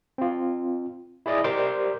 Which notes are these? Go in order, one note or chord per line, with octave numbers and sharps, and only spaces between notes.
C4 F4
E4 G#4 D5 D#5
G4 A#4 C5 D5 C6 D6